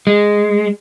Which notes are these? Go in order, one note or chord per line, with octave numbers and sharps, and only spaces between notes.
G#3